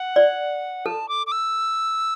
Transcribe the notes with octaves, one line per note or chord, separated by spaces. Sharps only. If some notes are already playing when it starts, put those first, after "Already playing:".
Already playing: F#5
D5
A4 A5
D6
D6
E6